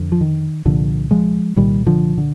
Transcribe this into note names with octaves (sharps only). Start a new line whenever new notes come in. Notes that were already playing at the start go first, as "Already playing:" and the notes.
Already playing: F2 D3
F3
D#3
C2 A#2 D3 F3
F3 G#3
C2 A#2 D#3 G3
D3 F3
D3